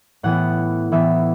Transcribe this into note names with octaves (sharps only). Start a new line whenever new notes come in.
A2 E3 B3 F#5
A2 E3 B3 E5